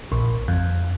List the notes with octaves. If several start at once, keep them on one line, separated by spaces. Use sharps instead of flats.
A#1
F2